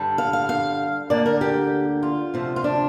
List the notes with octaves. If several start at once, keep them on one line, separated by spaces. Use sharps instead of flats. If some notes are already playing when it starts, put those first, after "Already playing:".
Already playing: G2 D3 G3
F5
F5
F5
D2 D3 A#3 D5
A#4
G4
F4
D2 C3 F3
F4
D4